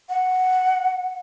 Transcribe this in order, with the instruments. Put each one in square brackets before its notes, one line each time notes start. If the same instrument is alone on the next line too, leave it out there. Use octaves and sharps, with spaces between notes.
[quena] F#5